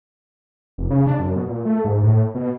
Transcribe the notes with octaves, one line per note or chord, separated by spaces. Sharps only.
F1
C#3
D4
F#2
B2
A#2
A3
G#2
A2
B2